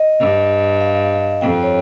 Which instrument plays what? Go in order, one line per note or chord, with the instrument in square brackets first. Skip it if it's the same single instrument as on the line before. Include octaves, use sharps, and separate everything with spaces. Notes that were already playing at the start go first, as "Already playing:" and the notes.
Already playing: [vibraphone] D#5
[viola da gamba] G2
[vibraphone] F5
[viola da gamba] F2 [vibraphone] G5
[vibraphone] C#5